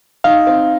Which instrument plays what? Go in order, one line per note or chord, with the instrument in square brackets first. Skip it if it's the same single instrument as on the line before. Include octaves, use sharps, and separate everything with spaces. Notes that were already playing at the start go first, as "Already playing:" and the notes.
[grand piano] D#4 [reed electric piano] F5
[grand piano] C4